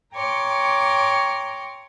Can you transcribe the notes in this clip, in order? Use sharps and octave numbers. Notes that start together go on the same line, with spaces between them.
C#5 G5 A#5 C6 D6